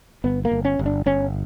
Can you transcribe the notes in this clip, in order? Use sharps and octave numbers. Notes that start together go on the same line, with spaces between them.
G1 B3
A#3
G1
C#4
G1
D4
G1 C#4